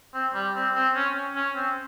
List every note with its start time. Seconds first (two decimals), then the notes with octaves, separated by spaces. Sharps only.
0.14 C4
0.34 G3
0.55 C4
0.75 C4
0.96 C#4
1.36 C#4
1.56 C4